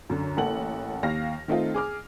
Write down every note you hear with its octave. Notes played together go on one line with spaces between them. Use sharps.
F#2 D3
A1 A#3 A4 F#5 F#7
D#2 F5 F6 A#6
D#3 A3 C4 D#4 F4
G#4 D6 F6